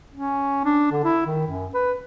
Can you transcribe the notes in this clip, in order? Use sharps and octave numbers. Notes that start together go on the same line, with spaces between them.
C#4
D4
D3
E4
D#3
F#2
B4